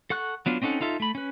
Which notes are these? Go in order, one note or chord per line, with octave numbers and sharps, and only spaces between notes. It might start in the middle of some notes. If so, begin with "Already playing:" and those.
A4 F#5 C#6 F#6
F#3 B3 D4 F4
C4 C#4 D#4 A4 F#5
D#4 F4 A4 E5
A3 B5
C#4 B4